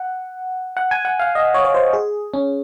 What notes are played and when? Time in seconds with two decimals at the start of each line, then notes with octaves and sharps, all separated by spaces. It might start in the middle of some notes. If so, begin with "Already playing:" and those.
Already playing: F#5
0.77 F#5
0.91 G#5
1.05 F#5
1.20 F5
1.35 D#5
1.54 C#5
1.64 C#5
1.74 C5
1.93 G#4
2.34 C#4